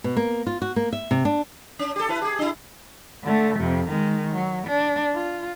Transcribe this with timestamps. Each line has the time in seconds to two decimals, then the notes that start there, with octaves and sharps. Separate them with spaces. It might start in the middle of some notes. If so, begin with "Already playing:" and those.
0.04 B2
0.17 A#3
0.47 F4
0.62 F#4
0.76 A#3
0.93 E5
1.11 C3
1.25 D4
1.79 C#4
1.96 G4 A4
2.09 E4 B4
2.22 G4 G#4
2.39 D4 E4
3.24 D3 A3
3.57 F2 C3
3.88 D#3 G#3
4.33 F#3
4.67 D4
5.15 F4